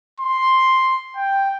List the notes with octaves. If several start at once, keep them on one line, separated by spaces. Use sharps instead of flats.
C6
G5